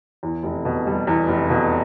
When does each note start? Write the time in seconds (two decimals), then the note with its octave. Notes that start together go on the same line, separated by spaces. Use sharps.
0.23 E2
0.43 F1
0.65 B2
0.87 G3
1.07 E2
1.28 F1
1.50 B2